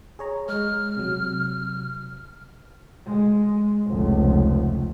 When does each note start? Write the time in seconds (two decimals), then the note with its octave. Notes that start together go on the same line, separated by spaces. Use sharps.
0.19 G#4 C#5 A#5
0.49 G#3 F6
0.97 C3 F#3
3.06 G#3
3.86 F1 C#2